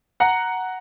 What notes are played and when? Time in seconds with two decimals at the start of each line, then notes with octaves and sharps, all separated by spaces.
0.20 F#5 A#5